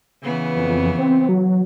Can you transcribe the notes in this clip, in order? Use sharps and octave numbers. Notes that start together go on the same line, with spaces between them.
C#3 E3 B3
F2
C4
F#3